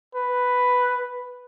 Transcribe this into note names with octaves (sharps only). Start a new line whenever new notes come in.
B4